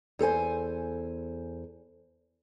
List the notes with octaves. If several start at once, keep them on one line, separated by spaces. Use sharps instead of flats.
E2 A4 C5 G#5